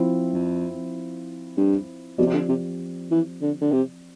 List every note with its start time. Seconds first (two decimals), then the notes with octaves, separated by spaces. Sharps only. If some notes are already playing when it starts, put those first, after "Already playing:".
Already playing: F3 C4 E4
0.34 F2
1.57 G2
2.18 B2 F3 C4 G4 D5
2.26 C3
2.34 D3
2.49 C3
3.11 E3
3.42 D3
3.62 D3
3.72 C3